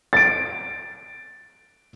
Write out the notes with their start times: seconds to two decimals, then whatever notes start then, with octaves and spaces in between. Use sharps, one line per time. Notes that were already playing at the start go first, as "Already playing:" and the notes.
0.13 A6 D7